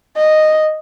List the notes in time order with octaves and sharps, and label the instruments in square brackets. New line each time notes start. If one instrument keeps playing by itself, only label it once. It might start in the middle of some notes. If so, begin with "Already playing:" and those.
[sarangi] D#5